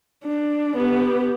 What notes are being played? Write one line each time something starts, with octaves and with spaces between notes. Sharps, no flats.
D4
B3 G4